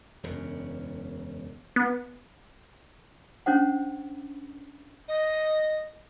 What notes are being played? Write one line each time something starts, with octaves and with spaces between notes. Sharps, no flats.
E1 F#2 C#3
B3
C#4 D4 C5 F#5
D#5